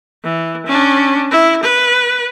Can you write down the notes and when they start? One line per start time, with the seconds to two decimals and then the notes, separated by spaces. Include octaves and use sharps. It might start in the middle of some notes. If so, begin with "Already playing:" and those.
0.24 E3
0.67 C#4 D4
1.31 E4
1.63 B4